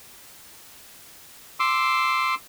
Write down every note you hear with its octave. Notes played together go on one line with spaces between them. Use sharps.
C6 D6 E6